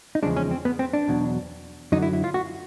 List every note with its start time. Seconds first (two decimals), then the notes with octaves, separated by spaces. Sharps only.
0.15 D#4
0.23 E2 C#3 F3 G#3 D4
0.36 C#4
0.51 C4
0.65 B3
0.79 C4
0.93 D4
1.08 E2 B2 F#3
1.92 F#2 D3 F#3 D#4
2.02 E4
2.13 E4
2.24 F4
2.34 F#4